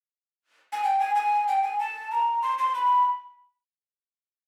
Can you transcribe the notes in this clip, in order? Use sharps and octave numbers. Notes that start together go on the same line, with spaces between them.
G#5
G5
G#5
G#5
G5
G#5
A5
A#5
C6
C6
B5